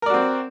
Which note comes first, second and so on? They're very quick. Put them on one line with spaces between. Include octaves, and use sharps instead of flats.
A#4 D5 F#4 C4